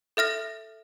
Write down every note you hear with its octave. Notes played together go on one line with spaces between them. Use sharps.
A4 E5 F6 A#6